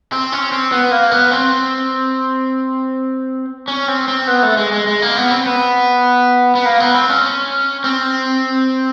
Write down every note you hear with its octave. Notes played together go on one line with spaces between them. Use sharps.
C4
C#4
C4
B3
A#3
B3
C4
C#4
C4
C4
B3
A3
G#3
G#3
G#3
A#3
B3
C4
B3
B3
A#3
B3
C4
C#4
C4